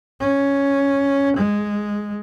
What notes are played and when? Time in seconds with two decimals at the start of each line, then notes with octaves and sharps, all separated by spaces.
0.21 C#4
1.38 G#3